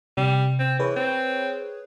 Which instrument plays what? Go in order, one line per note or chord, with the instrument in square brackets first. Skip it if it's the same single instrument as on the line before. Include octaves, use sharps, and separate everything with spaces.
[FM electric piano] C3 [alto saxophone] G3
[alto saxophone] C4
[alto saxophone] E3 [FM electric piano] G#4 B4 C#5
[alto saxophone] C4